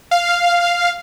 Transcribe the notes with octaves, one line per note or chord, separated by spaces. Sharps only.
F5